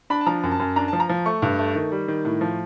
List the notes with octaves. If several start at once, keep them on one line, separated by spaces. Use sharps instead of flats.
D4 B5
A5
F3 A#5
F#2
A5
F#2
D4 A#5
F3 A5
A#5
F3
A3 C#6
G2
A3
D#3
G3
D#3
A2
F3